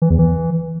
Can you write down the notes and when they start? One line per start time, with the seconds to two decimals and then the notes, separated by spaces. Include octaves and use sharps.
0.02 E3
0.10 E2
0.19 E3